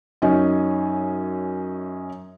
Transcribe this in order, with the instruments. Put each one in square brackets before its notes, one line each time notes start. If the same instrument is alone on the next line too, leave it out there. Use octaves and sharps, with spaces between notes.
[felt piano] F#2 C#4 D#4 G#5